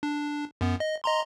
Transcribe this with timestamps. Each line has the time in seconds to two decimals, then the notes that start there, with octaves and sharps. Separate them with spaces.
0.03 D4
0.61 F#2 B3
0.80 D#5
1.04 D#5 A#5 C6